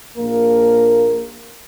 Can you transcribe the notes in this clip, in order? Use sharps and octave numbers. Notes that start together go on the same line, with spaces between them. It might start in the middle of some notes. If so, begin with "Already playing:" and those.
A#1 A#3 A#4